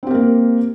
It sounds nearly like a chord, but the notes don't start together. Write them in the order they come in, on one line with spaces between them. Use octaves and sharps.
C4 G4 A#4 A#3